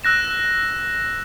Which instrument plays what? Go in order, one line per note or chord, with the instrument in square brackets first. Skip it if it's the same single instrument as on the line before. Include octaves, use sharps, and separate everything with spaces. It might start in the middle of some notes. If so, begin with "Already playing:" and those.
[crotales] E6 F#6 A#6 E7